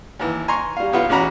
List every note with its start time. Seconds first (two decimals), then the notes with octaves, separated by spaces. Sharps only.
0.19 D#2 E3
0.48 G#5 A#5 C6 C#6
0.77 G3 F5
0.92 B1 B3 F4
1.09 A1 E2 C#4 F#4 A#5 B5